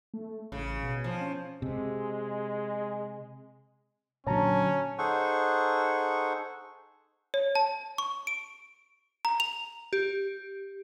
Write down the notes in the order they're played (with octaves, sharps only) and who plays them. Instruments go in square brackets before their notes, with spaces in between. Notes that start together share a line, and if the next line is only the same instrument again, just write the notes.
[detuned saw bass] A3
[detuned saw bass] A1 [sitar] C#3
[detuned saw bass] B2
[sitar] F3
[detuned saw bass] C#4
[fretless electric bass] C3 [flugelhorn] G#3
[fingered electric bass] A#2 D3 F#3 [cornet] C#4 [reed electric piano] C#5 A5 A#5
[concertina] D#4 G#4 A4 C5 F#5 C#6
[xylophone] C#5
A5
C#6
D7
A#5
F7
[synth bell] G4